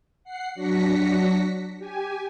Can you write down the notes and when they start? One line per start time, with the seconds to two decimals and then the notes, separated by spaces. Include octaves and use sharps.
0.24 F#5 C7
0.55 F#3 D4 F#4 A#6 B6 C#7
1.78 G4 G#5